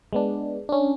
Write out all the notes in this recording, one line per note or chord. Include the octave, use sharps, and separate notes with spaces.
G#3 B3 D4
C#4 D4